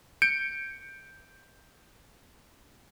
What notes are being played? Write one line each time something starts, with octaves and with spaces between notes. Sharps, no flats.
G6 C#7 D7